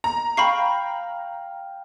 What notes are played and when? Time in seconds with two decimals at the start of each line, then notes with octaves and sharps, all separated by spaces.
0.04 A#5
0.37 F5 G5 B5 C#6 C7